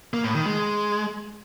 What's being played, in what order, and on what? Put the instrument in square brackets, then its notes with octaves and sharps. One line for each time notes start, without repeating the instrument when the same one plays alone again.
[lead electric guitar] A#3
A2
D#3
G#3